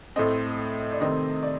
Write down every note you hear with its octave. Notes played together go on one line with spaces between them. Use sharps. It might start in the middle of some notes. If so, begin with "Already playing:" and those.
A2 A3 C4 D#5
D5
C3 D#3 A3 C4 D#5
D5